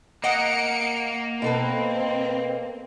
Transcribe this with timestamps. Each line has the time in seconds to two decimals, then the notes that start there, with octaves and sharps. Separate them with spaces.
0.24 A#3 D#5 F#5 A#5 C#7 D7
1.42 B2 C4 A4 B4